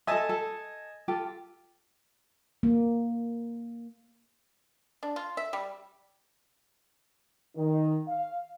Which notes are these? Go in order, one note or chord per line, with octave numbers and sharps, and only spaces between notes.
A4 D#5 E5 G#5 A5
A4
F4 G4 A4
A#3
D4
F4
E5
G3
D#3
F5